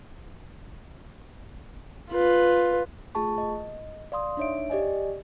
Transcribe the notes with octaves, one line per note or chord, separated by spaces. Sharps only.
F4 B4
A3 F4 G#4 A5 C#6
D#5
D5 F5 C6 D#6
D4 D#4 C#5 E5 D7
G4 D5 D#5 G#5